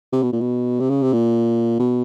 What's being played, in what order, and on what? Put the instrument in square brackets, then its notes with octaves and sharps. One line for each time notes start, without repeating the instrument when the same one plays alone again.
[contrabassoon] C3
B2
A#2
B2
C3
C#3
C3
A#2
B2